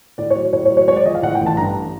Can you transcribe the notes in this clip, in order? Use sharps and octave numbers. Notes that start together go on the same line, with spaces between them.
A2 D5
C#5
F#3
A2 C#5
C#5
F#3
C#5
G#3 C#5
D5
F3 D#5
F5
A2 F#5
G5
A1
A5
G2 A#5